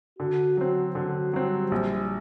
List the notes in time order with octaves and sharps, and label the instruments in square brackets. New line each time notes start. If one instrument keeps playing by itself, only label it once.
[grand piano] D3 [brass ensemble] F#4
[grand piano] F#3 C4
[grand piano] D3 [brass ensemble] F#4
[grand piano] F#3 C4 [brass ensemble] G3
[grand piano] A#1